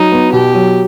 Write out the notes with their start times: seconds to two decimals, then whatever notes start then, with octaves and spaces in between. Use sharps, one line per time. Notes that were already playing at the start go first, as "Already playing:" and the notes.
Already playing: F#3 D#4
0.12 B3
0.32 B2 G4
0.54 F#3